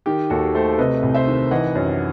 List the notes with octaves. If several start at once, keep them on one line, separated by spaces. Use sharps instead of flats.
D#3 G4
D#2 F#4 A4
A3 A4 C5
C3 B4 D#5
C2
C5 E5
D#3
E3 D#5 F#5
F#2